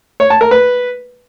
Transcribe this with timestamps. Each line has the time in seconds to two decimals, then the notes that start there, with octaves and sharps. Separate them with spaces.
0.20 C#5
0.30 A5
0.41 A#4
0.51 B4